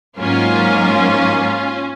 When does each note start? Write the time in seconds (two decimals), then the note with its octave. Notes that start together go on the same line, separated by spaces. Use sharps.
0.18 G#2 F#3 A#3 C#4 F4